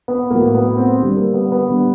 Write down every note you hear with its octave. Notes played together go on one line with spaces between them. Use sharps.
B3
A2 F#3 A#3
B3
C4
D3 G3
A#3
B3
B3
D3 G3